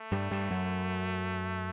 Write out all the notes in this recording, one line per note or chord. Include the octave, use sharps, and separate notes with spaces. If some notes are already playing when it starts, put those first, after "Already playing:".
Already playing: A3
G2 G3
G2 G3
F#2 F#3